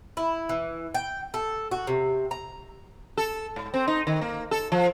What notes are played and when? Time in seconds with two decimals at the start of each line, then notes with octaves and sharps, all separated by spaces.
0.17 E4
0.49 E3
0.94 G5
1.34 A4
1.71 F#4
1.87 C3
2.31 A#5
3.18 A4
3.56 G#2
3.74 C4
3.88 D#4
4.07 D#3
4.21 A#3
4.51 A4
4.72 F3